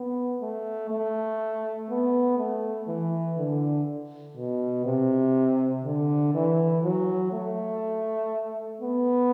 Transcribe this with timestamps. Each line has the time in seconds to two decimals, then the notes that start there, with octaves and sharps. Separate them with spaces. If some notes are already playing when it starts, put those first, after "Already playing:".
Already playing: B3
0.41 A3
0.90 A3
1.89 B3
2.38 A3
2.88 E3
3.37 D3
4.36 B2
4.85 C3
5.84 D3
6.34 E3
6.84 F#3
7.32 A3
8.81 B3